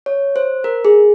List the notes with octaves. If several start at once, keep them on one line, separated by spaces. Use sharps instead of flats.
C#5
C5
A#4
G#4